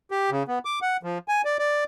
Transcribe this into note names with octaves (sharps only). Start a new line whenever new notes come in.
G4
C#3
B3
D6
F#5
F3
G#5
D5
D5